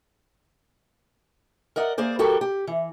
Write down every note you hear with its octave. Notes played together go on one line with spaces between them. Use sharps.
A#4 D5 D#5 F#5
A#3 G#4 C5 D5
G3 F#4 G4 A4 A#4
G4
E3